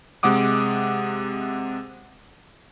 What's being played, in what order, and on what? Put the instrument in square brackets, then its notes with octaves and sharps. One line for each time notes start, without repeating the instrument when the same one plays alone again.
[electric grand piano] C3 G#3 F#5 D6 D#6